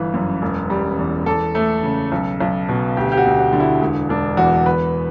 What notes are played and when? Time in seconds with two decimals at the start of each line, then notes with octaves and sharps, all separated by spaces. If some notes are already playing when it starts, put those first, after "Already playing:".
Already playing: G1 E3 B4
0.14 F#2
0.42 E1
0.70 G3
0.99 E2
1.26 E2 A4
1.55 A3
1.83 C#3
2.12 B1
2.41 B1
2.69 B2
2.96 D2 G4
3.12 G4
3.17 F#4
3.25 D2
3.39 F#4
3.53 D3
3.60 E4
3.82 E1
4.09 E1 D4
4.37 E2 F#4
4.66 E2 B4